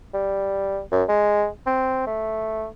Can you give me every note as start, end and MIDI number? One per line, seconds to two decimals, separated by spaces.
0.14 0.80 55
0.92 1.03 42
1.09 1.47 56
1.66 2.02 60
2.07 2.67 57